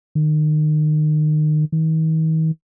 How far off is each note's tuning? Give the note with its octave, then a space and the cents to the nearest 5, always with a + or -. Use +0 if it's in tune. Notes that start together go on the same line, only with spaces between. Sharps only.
D#3 -30
D#3 +40